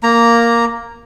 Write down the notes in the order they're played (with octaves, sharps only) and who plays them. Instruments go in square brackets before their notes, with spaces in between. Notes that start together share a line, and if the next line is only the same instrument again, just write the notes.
[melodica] A#3 A#5